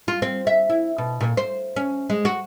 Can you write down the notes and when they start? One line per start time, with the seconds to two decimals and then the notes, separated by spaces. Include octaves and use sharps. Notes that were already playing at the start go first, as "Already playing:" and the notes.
0.08 F4
0.22 C4
0.47 E5
0.70 E4
0.98 B2
1.21 A#2
1.37 C5
1.76 C#4
2.10 G#3
2.25 F#4